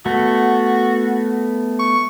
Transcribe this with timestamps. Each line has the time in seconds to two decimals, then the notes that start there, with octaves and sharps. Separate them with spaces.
0.06 A3 B3 F#4
1.79 C#6